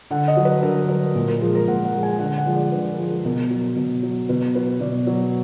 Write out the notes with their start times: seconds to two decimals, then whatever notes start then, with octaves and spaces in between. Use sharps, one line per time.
0.11 D3 F#5
0.28 D#5
0.37 F#3
0.45 B4
0.62 D3 A#4
0.88 F#3 A#4
1.15 A#2
1.28 A#4
1.41 F3 G#3 A#4
1.55 A#4
1.67 A#2 F#5
1.85 F#5
1.93 F3 G#3
2.03 G#5
2.19 D3 F#5
2.38 F#5
2.46 F3 G#3
2.55 D5
2.72 D3 B4
2.90 A#4
2.98 F3 G#3
3.07 A#4
3.24 B2 A#4
3.51 F#3
3.76 B2
4.03 F#3
4.29 B2 B4
4.55 F#3 B4
4.81 B2 D5
5.07 F#3